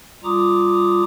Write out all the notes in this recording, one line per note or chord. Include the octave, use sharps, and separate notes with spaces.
G3 F4 A#5 D6 D#6